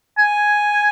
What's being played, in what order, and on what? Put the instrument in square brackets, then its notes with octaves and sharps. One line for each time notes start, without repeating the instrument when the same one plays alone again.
[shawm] G#5